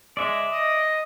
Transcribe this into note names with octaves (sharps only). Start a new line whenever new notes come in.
G#3 D5 E5
D#5